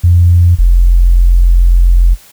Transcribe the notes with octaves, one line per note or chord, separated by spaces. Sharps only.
F2
F1